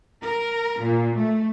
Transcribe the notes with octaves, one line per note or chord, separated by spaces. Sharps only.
A#4
A#2
A3